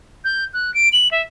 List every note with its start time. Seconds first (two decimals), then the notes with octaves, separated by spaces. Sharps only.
0.24 G6
0.54 F#6
0.74 D7
0.93 F#7
1.11 E5